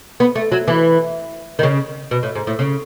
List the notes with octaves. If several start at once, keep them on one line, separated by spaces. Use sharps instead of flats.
B3
A3
F#3
E3
D#3
C#3
B2
A2
G#2
A2
C#3